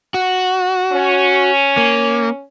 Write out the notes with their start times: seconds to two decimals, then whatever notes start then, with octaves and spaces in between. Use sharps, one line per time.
0.14 F#4
0.92 C#4
1.77 A#3